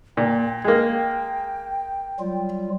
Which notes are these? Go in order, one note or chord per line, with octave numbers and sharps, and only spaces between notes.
A#2 G5
G#3 A#3
F#3 G3 F4